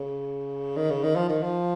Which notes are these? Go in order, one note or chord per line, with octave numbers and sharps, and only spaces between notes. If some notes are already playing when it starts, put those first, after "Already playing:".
Already playing: C#3
D#3
C#3
D#3
F3
D#3
F3